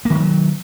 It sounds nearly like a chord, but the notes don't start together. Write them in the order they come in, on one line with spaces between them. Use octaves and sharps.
A#3 D#3 G3 F#3